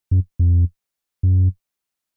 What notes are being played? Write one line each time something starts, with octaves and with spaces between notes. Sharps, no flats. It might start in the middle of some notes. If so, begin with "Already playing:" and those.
F#2
F2
F#2